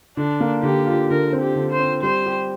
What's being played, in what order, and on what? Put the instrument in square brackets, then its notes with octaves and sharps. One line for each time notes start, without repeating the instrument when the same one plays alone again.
[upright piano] D3 [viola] D4
[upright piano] A#3
[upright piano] D3 [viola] G4
[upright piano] F4
[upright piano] D3 [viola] A#4
[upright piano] C4
[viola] G4
[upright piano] D3
[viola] C5
[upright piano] C4
[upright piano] G3 [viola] C5
[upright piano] G4